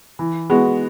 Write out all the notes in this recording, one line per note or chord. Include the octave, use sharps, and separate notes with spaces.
E3
G#3 B3 F#4